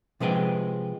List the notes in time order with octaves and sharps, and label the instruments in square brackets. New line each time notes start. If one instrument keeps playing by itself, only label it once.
[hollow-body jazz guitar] C3 F3 G#3 B4 F5 G5